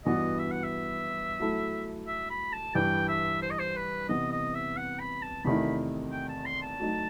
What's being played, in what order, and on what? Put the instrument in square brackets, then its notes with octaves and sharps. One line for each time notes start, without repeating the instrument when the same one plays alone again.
[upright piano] G2 E3 B3 F#4 [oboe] D#5
[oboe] E5
F#5
E5
[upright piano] F#3 A3 E4 A4
[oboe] E5
B5
A5
[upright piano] G2 E3 G3 [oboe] G5
[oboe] E5
C5
D#5
C5
B4
[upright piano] C3 E3 B3 [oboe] D#5
[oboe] D#5
E5
F#5
B5
A5
[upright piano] E2 C3 D#3 A3 E4 [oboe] B5
[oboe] G5
A5
C6
A5
[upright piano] F#3 A3 D#4 F#4